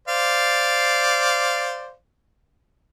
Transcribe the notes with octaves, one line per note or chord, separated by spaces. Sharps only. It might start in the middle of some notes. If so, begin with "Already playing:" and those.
C5 D5 F5